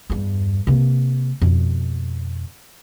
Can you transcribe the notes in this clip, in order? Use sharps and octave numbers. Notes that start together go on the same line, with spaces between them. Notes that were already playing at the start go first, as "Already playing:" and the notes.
E2 G2
C3 A#3
F2 B2